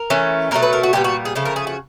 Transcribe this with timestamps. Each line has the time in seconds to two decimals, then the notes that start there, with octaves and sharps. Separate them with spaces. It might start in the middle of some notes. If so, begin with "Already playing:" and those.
Already playing: A#4
0.10 E3 A3 C#4
0.51 B2 F#3 A3 A#4
0.63 B4
0.73 A#4
0.83 F#4
0.93 A#2 G3 B3 G4
1.04 F#4
1.25 G#4
1.35 C#3 F3 A3 A4
1.45 A#4
1.56 G#4
1.67 F#4